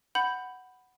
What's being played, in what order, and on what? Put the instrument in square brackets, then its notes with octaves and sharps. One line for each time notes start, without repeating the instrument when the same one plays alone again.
[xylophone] F#5 B5 G6